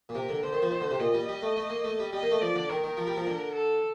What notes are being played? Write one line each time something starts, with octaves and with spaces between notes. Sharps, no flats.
A#2
C3 A#4
D3
D3 C5
D#3
F3
D#3
D3
C3
A#2 D#5
G3
G3
A3
A3
A#3
A3
G3
G3 D#5
A#3
A3
F3 D5
D3
D#3 A#4
D#3
F3
G3
F3
D3
A4